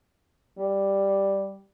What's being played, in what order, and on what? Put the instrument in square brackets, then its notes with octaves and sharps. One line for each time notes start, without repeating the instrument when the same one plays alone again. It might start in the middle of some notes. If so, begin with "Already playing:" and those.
[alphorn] G3